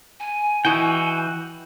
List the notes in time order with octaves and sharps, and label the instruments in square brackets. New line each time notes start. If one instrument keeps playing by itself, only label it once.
[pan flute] G#5
[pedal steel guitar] E3 F#4 G5 [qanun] E4 D#5